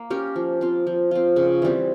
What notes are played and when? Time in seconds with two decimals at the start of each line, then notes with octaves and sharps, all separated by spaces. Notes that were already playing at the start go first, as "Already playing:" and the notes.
Already playing: A#3
0.10 C#4 G4 A#4
0.36 F3
0.61 C4 F4
0.87 F3
1.11 C4 F4
1.36 C#3
1.62 E3 G3 C4